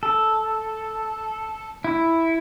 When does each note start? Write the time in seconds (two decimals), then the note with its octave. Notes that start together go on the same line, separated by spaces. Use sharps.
0.03 A4
1.84 E4